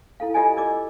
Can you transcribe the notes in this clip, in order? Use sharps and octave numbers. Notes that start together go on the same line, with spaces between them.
E4 A4 F5
F4 G4 A4 D5 D#5 G#5
A#4 D5 D#5 D6